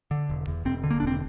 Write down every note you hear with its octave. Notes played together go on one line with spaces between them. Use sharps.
D3
E1
E2
E1 C4
D3
A#3
D4
E1 C4